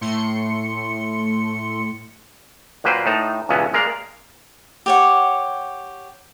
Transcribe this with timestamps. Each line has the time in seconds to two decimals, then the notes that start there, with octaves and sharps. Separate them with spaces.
0.01 A2 A3 C6 C#7
2.84 A#2 F#3 A#3 B4 C5 G5
3.06 A2 D#4 A5
3.49 C#2 G2 B2 E3 B3 C#4
3.74 G#3 A#3 A#4 D5 F5
4.86 G4 C#5 F#5